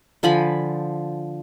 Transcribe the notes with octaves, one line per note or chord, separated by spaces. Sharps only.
D3 F3 G#5 B5